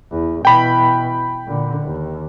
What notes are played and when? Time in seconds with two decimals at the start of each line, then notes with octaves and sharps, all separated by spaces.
0.11 E2
0.45 B2 E3 G5 B5
1.46 A#2 D3
1.84 D#2